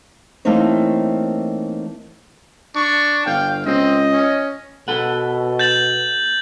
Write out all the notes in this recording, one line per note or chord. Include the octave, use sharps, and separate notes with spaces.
E3 A3 A#3 C4 D#4 C#5
D4 C#6
G1 F5 G5
C#2 C4 D#5
C#4
B2 A4 B4 F#5
G6 A6 F#7